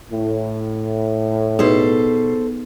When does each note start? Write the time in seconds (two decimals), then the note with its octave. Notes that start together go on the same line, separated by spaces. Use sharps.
0.11 A2
1.59 B2 D#4 G#4 A4 B4 C5